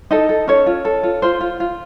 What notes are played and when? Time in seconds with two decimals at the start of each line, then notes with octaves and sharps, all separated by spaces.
0.11 D#4 A4 D#5
0.29 A4
0.47 C#4 A4 C#5
0.66 F4
0.85 A4
1.03 F4
1.22 F4 C5
1.41 F4
1.60 F4